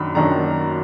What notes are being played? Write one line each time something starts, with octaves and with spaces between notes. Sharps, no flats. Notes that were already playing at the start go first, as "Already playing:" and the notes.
Already playing: F#2 D#3 F#3 D4 B5
F#2 D#3 F#3 D4 A#5